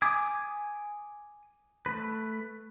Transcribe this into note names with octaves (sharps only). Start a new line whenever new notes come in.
G#5 D6 D#6
A3 B4